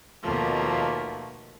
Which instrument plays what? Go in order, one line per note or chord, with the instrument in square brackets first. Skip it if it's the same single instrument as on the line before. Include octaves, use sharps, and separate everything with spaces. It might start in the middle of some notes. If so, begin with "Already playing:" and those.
[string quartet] D#2 B2 F3 A3 A#3